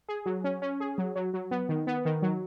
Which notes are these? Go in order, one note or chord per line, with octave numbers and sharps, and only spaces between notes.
G#4
F#3
C#4
C#4
G#4
F#3
F#3
F#3
B3
D#3
B3
D#3
F#3